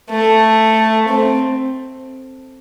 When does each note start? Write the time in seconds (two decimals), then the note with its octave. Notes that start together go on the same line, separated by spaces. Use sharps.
0.10 A3
1.08 C4